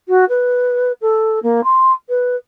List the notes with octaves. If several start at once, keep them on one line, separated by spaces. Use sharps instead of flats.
F#4
B4
A4
A#3
C6
B4